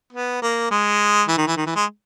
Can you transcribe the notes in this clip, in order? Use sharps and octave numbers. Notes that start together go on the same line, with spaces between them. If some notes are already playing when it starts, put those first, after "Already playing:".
B3
A#3
G#3
E3
D#3
E3
D#3
E3
G#3